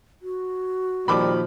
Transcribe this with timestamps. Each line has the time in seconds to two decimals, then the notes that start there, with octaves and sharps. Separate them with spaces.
0.22 F#4
1.08 A#2 D#3 F3 G3 B5 D6